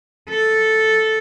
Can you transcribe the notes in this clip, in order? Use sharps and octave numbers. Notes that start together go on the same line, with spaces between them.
A4